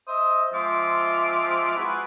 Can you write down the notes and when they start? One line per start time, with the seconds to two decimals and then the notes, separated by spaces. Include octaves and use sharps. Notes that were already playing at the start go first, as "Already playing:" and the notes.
0.08 C5 D#5 E5 D#6
0.53 F3 G#3 C4 F4 E5 D6
1.76 E4 F#4 G#4 B4